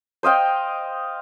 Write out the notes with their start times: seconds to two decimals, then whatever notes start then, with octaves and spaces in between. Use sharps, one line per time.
0.23 C5 D#5 F5 G5